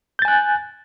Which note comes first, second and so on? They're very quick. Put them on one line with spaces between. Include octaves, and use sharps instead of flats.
G6 A6 G#5 F#6